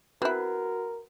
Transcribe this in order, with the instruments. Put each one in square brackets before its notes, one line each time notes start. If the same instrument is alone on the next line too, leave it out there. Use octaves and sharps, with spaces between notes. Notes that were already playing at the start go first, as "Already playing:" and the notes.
[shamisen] C4 E4 [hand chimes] F#4 [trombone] A#4 [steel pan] B4